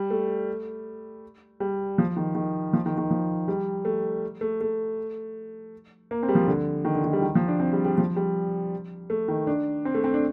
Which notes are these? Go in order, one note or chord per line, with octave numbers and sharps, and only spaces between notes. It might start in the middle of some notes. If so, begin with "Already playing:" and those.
Already playing: G3
A3
G3
F3
D#3
D#3
F3
D#3
D#3
F3
G3
A3
A3
A3
A#3
C4
G3
F3
D3
D#3
D3
D#3
G3
D#3
F3
D4
C4
G3
G3
F3
G3
A3
D#3
D4
C4
A3
C4
D4